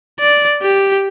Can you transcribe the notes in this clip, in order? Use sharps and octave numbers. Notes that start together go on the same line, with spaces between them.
D5
G4